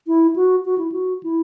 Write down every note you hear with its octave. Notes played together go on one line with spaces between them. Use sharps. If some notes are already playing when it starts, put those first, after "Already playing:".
E4
F#4
F#4
E4
F#4
E4